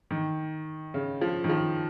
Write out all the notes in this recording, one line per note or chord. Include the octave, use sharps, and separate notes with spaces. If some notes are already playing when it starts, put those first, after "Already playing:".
D#3
C#3
F3
D#3
F3